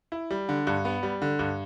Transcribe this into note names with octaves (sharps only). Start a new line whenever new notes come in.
E4
G3
D3
G2
B3
G3
D3
G2